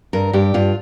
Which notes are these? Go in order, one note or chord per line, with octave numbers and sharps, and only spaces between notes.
G2 A#4
G2 G4
G2 F4